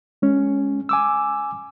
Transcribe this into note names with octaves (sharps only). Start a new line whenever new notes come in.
G#3 C#4
G#5 D6 E6